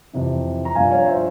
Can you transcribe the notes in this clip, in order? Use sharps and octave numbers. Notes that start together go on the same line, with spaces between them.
F2 C3 E3
A#5
G2 F3 F5 G#5
C#5 F5
C5 E5